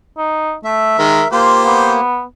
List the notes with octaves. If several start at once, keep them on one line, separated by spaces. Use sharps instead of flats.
D#4
A3 E5
D#3 G#3 A#4
A#3 F4 G4 C5
B3